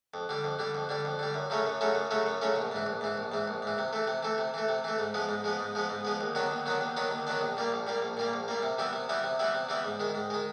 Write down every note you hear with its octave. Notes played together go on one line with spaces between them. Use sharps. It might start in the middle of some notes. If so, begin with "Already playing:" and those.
F2
D3 G3
F2
D3 G3
F2
D3 G3
F2
D3 G3
F#2
C#3 F#3 A3 C#4
F#2
C#3 F#3 A3 C#4
F#2
C#3 F#3 A3 C#4
F#2
C#3 F#3 A3 C#4
A#1
G#2 E3
A#1
G#2 E3
A#1
G#2 E3
A#1
G#2 E3
C3
E3 A3
C3
E3 A3
C3
E3 A3
C3
E3 A3
G#2
F3 G#3 B3
G#2
F3 G#3 B3
G#2
F3 G#3 B3
G#2
F3 G#3 B3
D#2
D#3 F#3 B3 D4
D#2
D#3 F#3 B3 D4
D#2
D#3 F#3 B3 D4
D#2
D#3 F#3 B3 D4
A#1
A#2 G3 A#3
A#1
A#2 G3 A#3
A#1
A#2 G3 A#3
A#1
A#2 G3 A#3
C3
E3 G3 B3 E4
C3
E3 G3 B3 E4
C3
E3 G3 B3 E4
C3
E3 G3 B3 E4
G#2
D#3 G#3
G#2
D#3 G#3